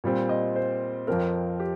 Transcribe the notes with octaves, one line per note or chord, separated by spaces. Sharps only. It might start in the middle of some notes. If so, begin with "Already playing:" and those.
A#2 G3 C4
D#5
C5
F2 F3 C4 A#4
G4